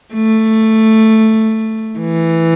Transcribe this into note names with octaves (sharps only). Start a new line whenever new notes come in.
A3
E3